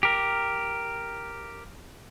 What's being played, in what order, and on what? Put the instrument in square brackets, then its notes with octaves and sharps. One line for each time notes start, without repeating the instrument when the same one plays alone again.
[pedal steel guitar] G4 A#4